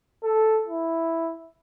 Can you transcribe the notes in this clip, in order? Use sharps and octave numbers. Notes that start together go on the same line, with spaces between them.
A4
E4